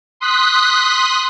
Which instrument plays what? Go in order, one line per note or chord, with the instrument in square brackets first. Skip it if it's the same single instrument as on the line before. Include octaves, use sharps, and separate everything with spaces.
[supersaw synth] C6 D#6 F#6 B6